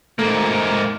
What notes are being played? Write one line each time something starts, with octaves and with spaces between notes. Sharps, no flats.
G#2 A3 A#3